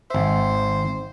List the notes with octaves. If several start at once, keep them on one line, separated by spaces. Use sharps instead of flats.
G#1 C5 E5